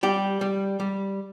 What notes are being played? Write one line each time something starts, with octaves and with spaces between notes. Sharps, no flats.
G3 G4
G3
G3